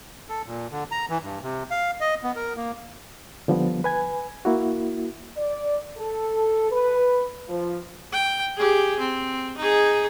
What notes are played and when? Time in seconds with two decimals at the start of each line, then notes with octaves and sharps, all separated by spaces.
0.29 A4
0.46 A#2
0.72 D3
0.91 A#5
1.09 E3
1.23 G2
1.42 C3
1.71 F5
2.00 D#5
2.23 B3
2.36 A#4
2.57 A#3
3.48 D3 F3 G3 B3
3.84 B4 G#5 G#6
4.45 A#3 E4 F#4
5.37 D5
5.97 A4
6.71 B4
7.48 F3
8.12 G5
8.57 G4 G#4
8.99 C4
9.58 D#4 G#4